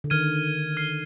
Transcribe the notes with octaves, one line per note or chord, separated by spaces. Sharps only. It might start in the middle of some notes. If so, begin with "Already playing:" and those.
D3
D#3 F6 G#6 D#7
F6 C7 G7